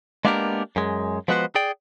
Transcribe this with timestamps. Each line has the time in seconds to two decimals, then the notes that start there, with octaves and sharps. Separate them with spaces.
0.25 G#3 A#3 B3 D4 G4 A#4
0.76 F#2 G#3
1.28 F3 G#3 B3 F#4 B4 C5
1.55 G#4 D5 G5